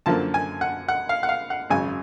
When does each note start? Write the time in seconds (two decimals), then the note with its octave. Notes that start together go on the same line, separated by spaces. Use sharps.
0.06 F#2 D3 F3 A#3 A5
0.34 G#5
0.61 F#5
0.88 F#5
1.09 F5
1.23 F#5
1.29 F5
1.50 F#5
1.70 G#1 F#2 C#3 G#5